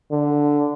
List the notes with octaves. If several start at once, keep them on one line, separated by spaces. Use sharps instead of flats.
D3